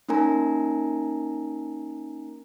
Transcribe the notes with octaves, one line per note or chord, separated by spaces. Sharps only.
A#3 C#4 D#4 A#4 G#5 A#5